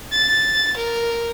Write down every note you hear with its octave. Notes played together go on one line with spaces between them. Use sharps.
A6
A#4